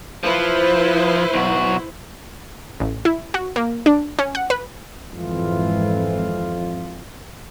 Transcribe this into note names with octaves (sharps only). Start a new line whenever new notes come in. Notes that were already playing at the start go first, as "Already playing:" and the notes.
F3 E4 B4 C5
B1 F#4
A1
E4
F#4
A#3
D4
C#4
F#5
B4
G#1 F2 E3 F4